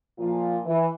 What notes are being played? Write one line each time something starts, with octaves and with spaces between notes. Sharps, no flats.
A#2 F3 F4
E3